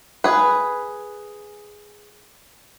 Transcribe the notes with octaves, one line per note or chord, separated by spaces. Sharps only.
G#4 B4